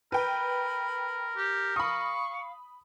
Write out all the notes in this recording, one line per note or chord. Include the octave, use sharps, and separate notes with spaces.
A#4 B4 G5 B5
G4
F5 B5 C#6 D#6